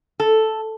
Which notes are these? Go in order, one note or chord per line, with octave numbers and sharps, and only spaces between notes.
A4